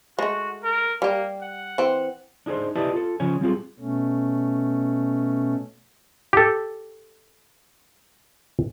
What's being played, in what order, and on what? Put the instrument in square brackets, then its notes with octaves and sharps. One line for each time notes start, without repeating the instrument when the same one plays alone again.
[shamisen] G#3 A3 [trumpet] F#4
[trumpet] A#4
[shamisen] G3 G4 [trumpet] A#3
[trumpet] F#5
[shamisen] E3 C4
[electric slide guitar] D4 D#4 G#4 A#4 C5
E4 G4 B4 D5 D#5 A5
F4 A4
C#3 F3 C#5 G#5
G3 C4 F4 G#4
[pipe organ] B2 A3 C#4
[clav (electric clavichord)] G4 A4